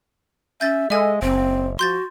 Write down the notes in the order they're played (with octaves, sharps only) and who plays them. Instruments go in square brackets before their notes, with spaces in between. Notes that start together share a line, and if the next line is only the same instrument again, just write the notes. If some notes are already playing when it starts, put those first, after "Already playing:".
[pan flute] C#4 [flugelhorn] E5 [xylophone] G6 A6
[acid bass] G#3 [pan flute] A4 [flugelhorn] D#5 [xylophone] E5 G#5
[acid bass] F#1 [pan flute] C4 [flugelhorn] C5
[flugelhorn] F3 [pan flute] F#4 [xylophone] C6 G6 A6